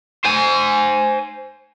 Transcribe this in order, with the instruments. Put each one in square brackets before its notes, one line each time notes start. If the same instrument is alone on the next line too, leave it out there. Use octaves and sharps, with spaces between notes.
[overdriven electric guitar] C5 G#5